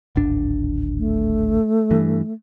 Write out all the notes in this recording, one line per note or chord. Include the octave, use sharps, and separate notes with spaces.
D1 G#1 D4
A3
G2 E3